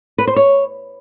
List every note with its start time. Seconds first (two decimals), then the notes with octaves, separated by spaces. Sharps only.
0.18 B4
0.27 C5
0.36 C#5